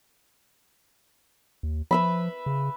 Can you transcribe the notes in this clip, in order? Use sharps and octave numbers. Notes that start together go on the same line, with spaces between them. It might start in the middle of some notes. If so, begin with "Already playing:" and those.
D#2
F3 B4 E5 B5
C#3